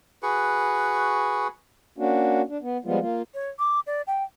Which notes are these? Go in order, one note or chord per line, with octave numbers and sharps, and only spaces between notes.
F#4 G#4 B4 C#6
A#3 C#4 D4 F#4
D4
B3
F3 G3 G#3 B3 F4
A#3 F4
C#5
D6
D5
G5